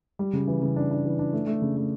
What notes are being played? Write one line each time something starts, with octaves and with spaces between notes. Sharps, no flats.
G3
C#3
E3
C#3
D4
D4
E3
D4
A3
A3
C#3
A3